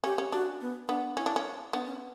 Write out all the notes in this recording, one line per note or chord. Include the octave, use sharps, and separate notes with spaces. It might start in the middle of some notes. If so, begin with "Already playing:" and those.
C#4 G4
C#4
D4 F#4
B3
B3 D4
C#4 E4
D4
C#4
B3 D4
C#4